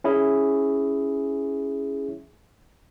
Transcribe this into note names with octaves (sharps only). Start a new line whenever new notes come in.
C#4 E4 G#4